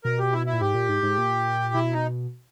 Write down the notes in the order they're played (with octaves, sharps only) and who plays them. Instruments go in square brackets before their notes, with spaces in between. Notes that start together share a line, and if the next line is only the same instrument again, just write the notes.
[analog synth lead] B2 [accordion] A#4
[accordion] G4
E4
E4
[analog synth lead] A#2
[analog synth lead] G#2 [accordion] G4
[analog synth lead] A#2
G#2
G#2
A#2
[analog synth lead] B2 [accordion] E4
[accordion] D#4